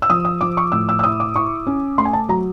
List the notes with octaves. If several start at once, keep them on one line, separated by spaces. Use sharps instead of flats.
E6
F3 D#6
D#6
F3 D6
C#6
A2 E6
E6
E6
E4 D#6
D6
E4 C#6
C#4
A3 C6
G#5
A5
F#3 A#5